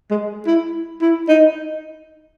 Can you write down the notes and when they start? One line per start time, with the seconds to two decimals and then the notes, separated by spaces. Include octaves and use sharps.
0.11 G#3
0.47 E4
1.01 E4
1.29 D#4